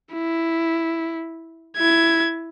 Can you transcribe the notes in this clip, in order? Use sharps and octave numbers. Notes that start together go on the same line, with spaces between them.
E4
E4 G#6